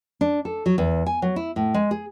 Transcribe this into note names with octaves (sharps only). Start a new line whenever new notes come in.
D4
A4
F#3
E2
G#5
F#3
E4
A2
G#3
G#4